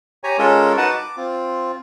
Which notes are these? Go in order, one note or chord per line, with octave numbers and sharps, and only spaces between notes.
G4 C#5 G#5 A#5
G#3 C#4 F4 A4 A#4
D#4 F#4 B4 F#5 A5
D6
C4 F4